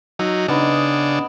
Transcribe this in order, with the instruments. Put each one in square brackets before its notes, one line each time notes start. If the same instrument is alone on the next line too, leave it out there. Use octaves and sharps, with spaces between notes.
[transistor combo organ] F#3 D#4 [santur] E6
[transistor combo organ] C#3 D4 [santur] B3 D#4 D#6